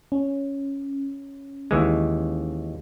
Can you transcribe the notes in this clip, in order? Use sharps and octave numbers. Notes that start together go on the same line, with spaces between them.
C#4
D#2 E3 G#3